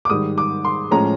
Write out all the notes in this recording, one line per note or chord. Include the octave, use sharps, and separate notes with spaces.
D6
G#2 D#3 G3 D#6
D6
C6
A2 F3 G#3 C#4 A#5